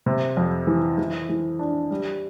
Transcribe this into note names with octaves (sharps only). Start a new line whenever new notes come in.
C3
F2
E3
E3
E3
D4
G3